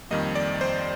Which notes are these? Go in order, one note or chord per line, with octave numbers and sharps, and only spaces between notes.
F2 D#3 G3 A#3 D#5
D5
C5